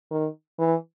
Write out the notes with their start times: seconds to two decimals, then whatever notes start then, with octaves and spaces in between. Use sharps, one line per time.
0.11 D#3
0.59 E3